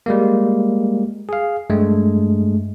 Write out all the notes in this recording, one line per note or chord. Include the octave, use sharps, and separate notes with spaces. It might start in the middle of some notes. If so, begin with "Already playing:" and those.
G3 G#3 A#3
G#4 F5
G2 G#3 A3